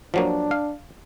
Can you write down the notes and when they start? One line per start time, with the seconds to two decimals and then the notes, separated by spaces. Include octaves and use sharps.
0.14 F3 F#3 A#3 D4
0.51 F5